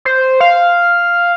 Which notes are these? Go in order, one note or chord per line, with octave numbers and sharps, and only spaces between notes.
C5
F5